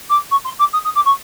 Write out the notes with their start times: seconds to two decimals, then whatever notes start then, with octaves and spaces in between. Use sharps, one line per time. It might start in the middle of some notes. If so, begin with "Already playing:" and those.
0.09 D6
0.31 C#6
0.44 C6
0.59 D6
0.73 D#6
0.84 D#6
0.95 D6
1.05 C#6